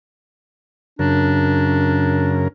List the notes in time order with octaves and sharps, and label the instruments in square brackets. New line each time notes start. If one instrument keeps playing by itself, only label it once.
[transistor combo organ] F#2 C#3 A#4 [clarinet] D4